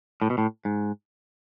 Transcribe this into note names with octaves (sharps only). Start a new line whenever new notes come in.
A2
B2
A2
G#2